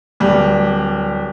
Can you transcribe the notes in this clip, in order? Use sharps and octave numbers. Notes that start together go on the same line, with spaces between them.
D1 G3